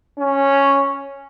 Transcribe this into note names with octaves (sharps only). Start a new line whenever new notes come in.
C#4